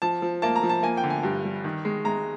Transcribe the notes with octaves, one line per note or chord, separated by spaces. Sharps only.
F3 A5
F3
A#3 A5
A#5
F3
A5
A#3 G#5
G5
D3
G#5
G2
G3
D#3
G#3
G#3 A#5